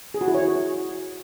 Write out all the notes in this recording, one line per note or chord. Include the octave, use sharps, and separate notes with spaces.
G#4
F#4
E4
C#5